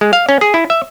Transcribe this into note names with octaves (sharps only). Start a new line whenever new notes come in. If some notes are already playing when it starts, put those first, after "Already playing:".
G#3
F5
C#4
G#4
E4
E5